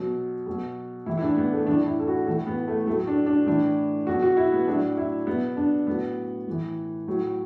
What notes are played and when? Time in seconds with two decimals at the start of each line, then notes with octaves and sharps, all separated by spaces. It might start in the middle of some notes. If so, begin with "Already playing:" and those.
Already playing: B2 F#3
0.47 B2 F#3
1.06 A2 E3 E4
1.17 E4
1.22 D4
1.36 B3
1.52 A3
1.67 A2 E3 D4
1.87 E4
2.00 A4
2.08 F#4
2.27 A2 E3 A4
2.47 B3
2.67 A3
2.86 A2 A3
2.91 F#3
3.07 D4
3.26 D4
3.46 A2 E3 D4
4.07 B2 F#3 F#4
4.23 F#4
4.37 E4
4.52 B3
4.67 A2 F#3 D4
4.97 E4
5.27 B2 F#3 B3
5.57 D4
5.87 A2 F#3 B3
6.47 A2 E3
7.08 A2 F#3